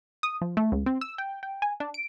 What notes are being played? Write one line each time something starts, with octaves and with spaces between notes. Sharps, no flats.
D#6
F3
A3
C#2
C4
E6
G5
G5
G#5
D4
D7